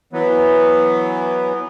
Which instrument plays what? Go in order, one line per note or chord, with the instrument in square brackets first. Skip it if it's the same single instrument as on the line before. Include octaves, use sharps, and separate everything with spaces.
[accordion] E3 F#3 B3